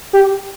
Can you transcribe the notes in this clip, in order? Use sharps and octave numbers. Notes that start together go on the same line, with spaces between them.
G4